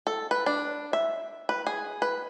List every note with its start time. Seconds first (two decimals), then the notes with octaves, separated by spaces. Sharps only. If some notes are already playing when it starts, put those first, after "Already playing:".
0.07 A4
0.31 B4
0.46 D4
0.93 E5
1.49 B4
1.67 G#4
2.02 B4